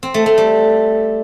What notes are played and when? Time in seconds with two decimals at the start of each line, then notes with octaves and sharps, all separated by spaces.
0.03 C4
0.14 A3
0.26 A3
0.38 G3